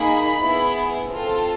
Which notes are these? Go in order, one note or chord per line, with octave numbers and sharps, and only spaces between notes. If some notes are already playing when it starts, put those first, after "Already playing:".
Already playing: A#3 D#4 G#4 B5
B3 E4 G#4
C4 F4 A4